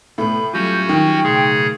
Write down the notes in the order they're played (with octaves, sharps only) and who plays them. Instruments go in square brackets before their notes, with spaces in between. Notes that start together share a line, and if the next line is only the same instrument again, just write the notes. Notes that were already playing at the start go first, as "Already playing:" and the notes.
[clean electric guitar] C2 B3 [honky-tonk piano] A2 [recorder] B5
[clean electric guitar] F#3 G3 F4 [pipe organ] C#4 F#4 [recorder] G6
[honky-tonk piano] D#3 [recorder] G5
[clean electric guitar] B1 A2 C6 [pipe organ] C#3 G#4